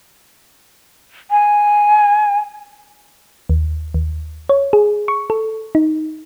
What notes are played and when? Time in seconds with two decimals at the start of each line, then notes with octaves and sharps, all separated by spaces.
1.31 G#5
3.49 D#2
3.94 D#2
4.49 C#5
4.73 G#4
5.08 C#6
5.30 A4
5.75 D#4